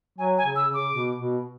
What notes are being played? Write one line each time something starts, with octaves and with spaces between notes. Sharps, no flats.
F#3 G#5
G#5
C#3
E6
C#3
D6
B2
B2